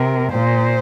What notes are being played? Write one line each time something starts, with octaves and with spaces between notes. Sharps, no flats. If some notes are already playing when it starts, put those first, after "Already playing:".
Already playing: C3 A#4
A#2 C5